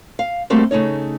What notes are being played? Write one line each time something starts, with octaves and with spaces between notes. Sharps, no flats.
F5
G3 A3 A#3 C4 F#4
C#3 A3 D#4 C#5